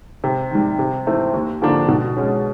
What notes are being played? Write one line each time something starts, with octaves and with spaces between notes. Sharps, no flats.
C3
D#3 G3
C3
E3 A3 C4
D#2
D3 F3 A#3 D4
B2
G#3 C#4